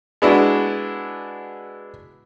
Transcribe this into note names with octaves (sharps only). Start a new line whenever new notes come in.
G#3 B3 D4 E4 F#4